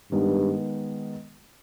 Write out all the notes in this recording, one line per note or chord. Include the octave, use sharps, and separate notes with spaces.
G2 D#3 G#3 B3